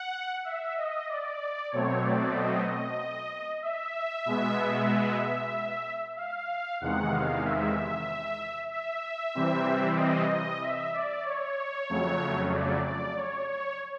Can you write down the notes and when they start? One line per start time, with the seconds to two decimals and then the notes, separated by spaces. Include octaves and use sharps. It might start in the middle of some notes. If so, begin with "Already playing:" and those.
Already playing: F#5
0.45 E5
0.77 D#5
1.09 D5
1.71 B2 F#3 A3 C4 C#5
2.03 D5
2.36 D#5
3.62 E5
4.26 B2 G#3 B3
6.17 F5
6.81 E2 C3 D#3 G#3 F#5
7.12 F5
7.44 E5
8.71 E5
9.35 C3 E3 G3 C4
9.98 D#5
10.30 D#5
10.62 E5
10.93 D5
11.25 C#5
11.89 F2 C#3 F#3 A3
12.53 D5
12.85 D5
13.17 C#5
13.48 C#5